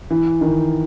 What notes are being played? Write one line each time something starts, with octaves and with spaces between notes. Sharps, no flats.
E3
D#3